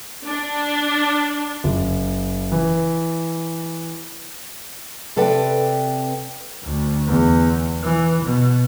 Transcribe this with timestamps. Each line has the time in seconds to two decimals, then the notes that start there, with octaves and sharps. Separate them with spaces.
0.23 D4
1.64 F#1
2.52 E3
5.16 C3 A4 B4 D5 G5
6.63 D2
7.07 E2
7.83 E3
8.24 B2